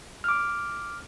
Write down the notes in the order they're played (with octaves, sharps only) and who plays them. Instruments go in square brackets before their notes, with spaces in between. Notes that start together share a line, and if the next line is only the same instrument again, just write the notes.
[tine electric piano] D6 F6